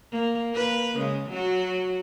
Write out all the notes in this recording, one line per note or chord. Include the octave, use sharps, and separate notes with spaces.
A#3
A#3 B4
C#3 G#3
F#3 F#4